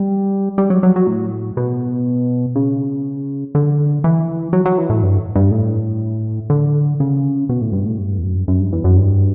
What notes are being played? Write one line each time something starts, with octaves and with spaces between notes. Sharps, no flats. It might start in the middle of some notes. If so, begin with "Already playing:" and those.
Already playing: G3
G3
F#3
F#3
F#3
A2
B2
C#3
D3
E3
F#3
F#3
E3
A2
G2
G2
A2
D3
C#3
B2
A2
G2
A2
G2
E2
F#2
F#2
G2
E2
F#2
G2